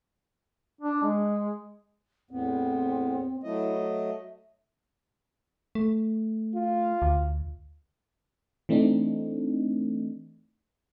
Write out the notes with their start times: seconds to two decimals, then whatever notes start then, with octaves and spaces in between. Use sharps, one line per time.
0.81 D4
1.03 G#3
2.31 E2 A2 B3 C4
3.43 F#3 A3 E4 D#5
3.80 E5
5.75 A3
6.55 F4
7.02 D2
8.69 E3 A3 C4 D4 D#4